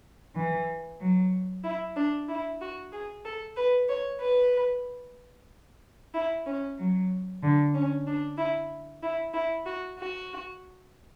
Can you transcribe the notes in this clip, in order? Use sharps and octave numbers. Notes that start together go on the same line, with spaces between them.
E3
F#3
E4
D4
E4
F#4
G#4
A4
B4
C#5
B4
E4
C#4
F#3
D3
C#4
D4
E4
E4
E4
F#4
F#4